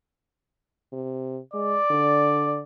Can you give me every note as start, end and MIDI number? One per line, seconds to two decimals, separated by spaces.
0.93 1.40 48
1.53 1.77 56
1.53 2.60 74
1.91 2.64 50